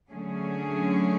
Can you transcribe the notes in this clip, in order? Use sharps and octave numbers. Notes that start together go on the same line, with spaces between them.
D3 F#3 A3 C#4 G#4